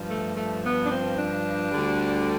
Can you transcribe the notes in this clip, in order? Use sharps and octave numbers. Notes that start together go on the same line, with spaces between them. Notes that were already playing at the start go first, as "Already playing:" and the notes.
Already playing: G2 F3
A3
A3
B3
D4
C4
D4
D2 D3 G3